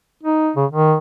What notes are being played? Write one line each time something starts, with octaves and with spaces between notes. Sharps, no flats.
D#4
C#3
D#3